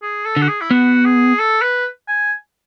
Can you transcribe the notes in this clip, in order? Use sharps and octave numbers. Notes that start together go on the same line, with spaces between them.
G#4
A4
D3
F#4
G#4
E4
B3 F#4
G#4
A4
B4
G#5